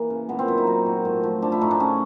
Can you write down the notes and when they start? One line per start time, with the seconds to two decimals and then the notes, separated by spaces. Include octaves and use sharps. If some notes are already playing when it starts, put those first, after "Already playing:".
Already playing: E3 A#3
0.10 C#3
0.29 A#2 B3
0.39 C4
0.48 F#3 E4
0.58 D#4
0.67 F#3
0.86 A#2
1.05 A2
1.23 F3
1.42 F3 D4
1.52 E4
1.61 A2 D#4
1.71 D4
1.80 C#3 C#4